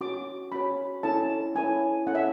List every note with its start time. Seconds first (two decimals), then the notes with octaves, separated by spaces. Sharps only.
0.01 C#4 F#4 C#5 D6
0.52 C#4 F#4 C#5 B5
1.03 C#4 E4 A4 C#5 A5
1.55 C#4 E4 A4 C#5 G#5
2.07 C#4 E4 A4 C#5 F#5
2.15 E5